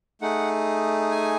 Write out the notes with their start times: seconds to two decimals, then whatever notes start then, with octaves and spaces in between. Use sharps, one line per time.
0.21 A3 D#4 G#4 F#5
1.11 G#5